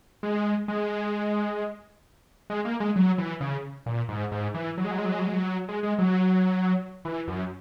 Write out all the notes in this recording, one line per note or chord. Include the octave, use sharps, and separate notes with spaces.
G#3
G#3
G#3
A#3
G#3
F#3
E3
C#3
A#2
G#2
G#2
E3
F#3
G#3
F#3
G#3
F#3
G#3
F#3
G#3
F#3
G#3
G#3
F#3
E3
F#2